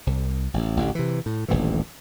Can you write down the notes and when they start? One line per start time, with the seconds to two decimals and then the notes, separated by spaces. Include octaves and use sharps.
0.07 C2
0.54 A1
0.77 A1 D2 D3
0.95 C3 E3
1.26 A2
1.48 D#1 A1 D2 E3